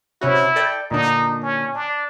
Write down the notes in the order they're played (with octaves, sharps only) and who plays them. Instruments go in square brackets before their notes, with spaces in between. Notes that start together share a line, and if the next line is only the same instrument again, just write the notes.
[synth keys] C3 C#4 F#4 [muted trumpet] E4
[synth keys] A4 D5 G5
[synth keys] A#2 D3 D4 [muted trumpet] D#4
[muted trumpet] C#4
D4